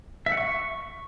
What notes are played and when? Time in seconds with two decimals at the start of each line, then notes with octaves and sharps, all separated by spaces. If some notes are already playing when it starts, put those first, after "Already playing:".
0.26 E5
0.32 F#5
0.37 C#6